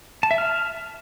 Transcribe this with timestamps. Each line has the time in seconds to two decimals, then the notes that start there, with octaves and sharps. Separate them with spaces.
0.23 A5
0.31 E5
0.38 F6